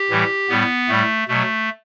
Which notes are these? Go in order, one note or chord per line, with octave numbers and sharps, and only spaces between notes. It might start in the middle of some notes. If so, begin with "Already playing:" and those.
Already playing: G4
A2 E3 G3
A2 G3 B3
A2 G3 A3
B2 F#3 A3